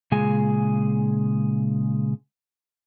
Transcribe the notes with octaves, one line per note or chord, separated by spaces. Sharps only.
A#2 C#3 G#3 G#4 G#5